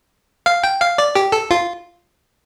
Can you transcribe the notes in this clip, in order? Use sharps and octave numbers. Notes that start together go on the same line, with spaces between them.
F5
G5
F5
D5
G4
A4
F4